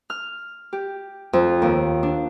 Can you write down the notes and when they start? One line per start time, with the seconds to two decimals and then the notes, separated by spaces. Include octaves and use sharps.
0.10 F6
0.73 G4
1.33 F2
1.62 D#2
2.03 D4